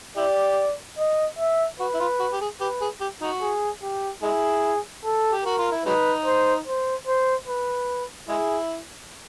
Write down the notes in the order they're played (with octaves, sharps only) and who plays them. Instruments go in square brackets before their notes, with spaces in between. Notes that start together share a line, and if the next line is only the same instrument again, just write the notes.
[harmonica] E4 G4 [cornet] D5
[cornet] D#5
E5
[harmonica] F#4 [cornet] B4
[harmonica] E4
F4
F#4
G4
G#4
[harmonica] G4 [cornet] B4
[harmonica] G#4
G4
D#4 F#4
[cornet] G#4
G4
[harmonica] G#3 E4 [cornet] G#4
[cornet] A4
[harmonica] G4
[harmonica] F#4 [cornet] A#4
[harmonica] F4
E4
[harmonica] F#3 G#3 D#4 [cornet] B4
[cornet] C5
C5
C5
B4
[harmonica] G#3 E4 [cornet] G#4